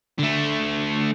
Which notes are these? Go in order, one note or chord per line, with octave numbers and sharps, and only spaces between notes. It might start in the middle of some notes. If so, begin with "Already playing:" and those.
D3 A3